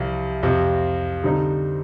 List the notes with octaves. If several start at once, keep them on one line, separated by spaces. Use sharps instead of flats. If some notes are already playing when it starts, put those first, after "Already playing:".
Already playing: C2 C3 F3
F2 C3 F3
D3 G3 C4 D#4